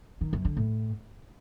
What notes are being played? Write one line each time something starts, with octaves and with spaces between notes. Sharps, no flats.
D#3
F#2
D3
A2